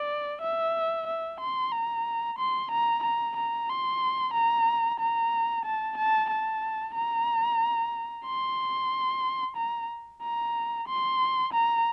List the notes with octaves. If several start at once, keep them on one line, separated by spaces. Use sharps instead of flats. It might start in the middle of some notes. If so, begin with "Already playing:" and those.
Already playing: D5
E5
E5
C6
A#5
C6
A#5
A#5
A#5
C6
A#5
A#5
A5
A5
A5
A#5
C6
A#5
A#5
C6
A#5